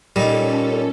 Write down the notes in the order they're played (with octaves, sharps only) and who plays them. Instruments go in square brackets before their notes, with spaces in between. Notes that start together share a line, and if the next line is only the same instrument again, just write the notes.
[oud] A#2 [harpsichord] G3 D#4 [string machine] C#4 A4